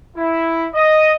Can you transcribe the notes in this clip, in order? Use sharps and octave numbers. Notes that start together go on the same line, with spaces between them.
E4
D#5